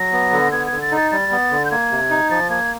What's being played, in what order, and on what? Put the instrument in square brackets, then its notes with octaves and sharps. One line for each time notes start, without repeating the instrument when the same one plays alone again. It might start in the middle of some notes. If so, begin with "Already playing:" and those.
Already playing: [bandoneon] F#3 [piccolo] A#6
[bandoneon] B3
D3
[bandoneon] B3 [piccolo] G#6
[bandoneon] D3 [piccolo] G#6
[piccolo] A6
[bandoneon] D#4
[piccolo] A6
[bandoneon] G3 [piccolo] A6
[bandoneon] B3
D3
[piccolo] G6
[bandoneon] A#3 [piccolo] G#6
[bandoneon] C3
D#4
[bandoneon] F3 [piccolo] A6
[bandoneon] A#3 [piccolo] G#6